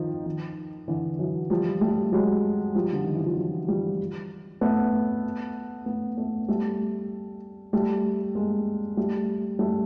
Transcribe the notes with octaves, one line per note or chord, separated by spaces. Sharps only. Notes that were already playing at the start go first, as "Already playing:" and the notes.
Already playing: D#3 F3
D#3 F3
D3 E3
E3 F#3
F3 G3
G3 A3
F#3 G#3
F3 G3
D3
D#3
E3
F3
E3 F#3
F3 G3
A3 B3
A3 B3
A3 B3
G3 A3
G3 A3
G#3 A#3
G3 A3
G3 A3